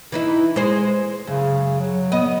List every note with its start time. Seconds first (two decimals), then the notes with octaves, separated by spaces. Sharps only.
0.12 E3 D#4 E4
0.56 G#3 C5
1.27 F#2 C#3
1.80 F#3
2.12 B3 D#5